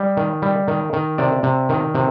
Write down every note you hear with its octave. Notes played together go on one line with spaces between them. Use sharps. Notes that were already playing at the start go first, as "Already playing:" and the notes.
Already playing: G3 D#5
D#3
G3
D#3
D#3
C3 D5
C3
D#3
C3